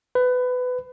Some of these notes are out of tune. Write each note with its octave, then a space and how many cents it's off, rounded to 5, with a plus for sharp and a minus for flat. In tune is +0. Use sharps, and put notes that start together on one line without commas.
B4 +20